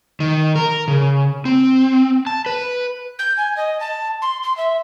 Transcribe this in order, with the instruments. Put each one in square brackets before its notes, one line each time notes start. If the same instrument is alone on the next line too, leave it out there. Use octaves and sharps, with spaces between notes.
[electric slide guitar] D#3
A#4
C#3
C4
A5
B4
[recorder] G6
G#5
D#5
A5
C6
C6
E5